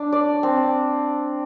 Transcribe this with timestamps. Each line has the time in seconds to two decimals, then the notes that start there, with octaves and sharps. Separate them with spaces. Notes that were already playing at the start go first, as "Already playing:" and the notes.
Already playing: D4
0.13 D5
0.43 C4